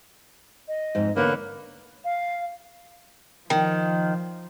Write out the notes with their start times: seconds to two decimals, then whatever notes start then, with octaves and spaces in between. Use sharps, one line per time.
0.68 D#5
0.95 F2 G#2
1.16 E2 D3 A#3 B3 C#5 B5 F#6
2.05 F5
3.50 D#3 F3